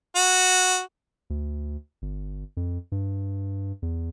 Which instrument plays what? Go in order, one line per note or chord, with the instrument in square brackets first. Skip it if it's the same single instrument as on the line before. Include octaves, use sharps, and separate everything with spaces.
[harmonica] F#4
[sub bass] D2
G1
F2
G2
E2